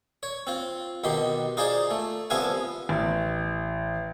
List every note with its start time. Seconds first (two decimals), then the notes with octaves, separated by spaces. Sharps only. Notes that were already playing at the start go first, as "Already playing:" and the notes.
0.23 C#5
0.47 C4 F4
1.04 B1 B2 D#3 G4 C6
1.57 D#4 F4 G#4 C5 D5
1.91 A3
2.30 C2 F3 B3 E5 F5 G#5
2.89 A1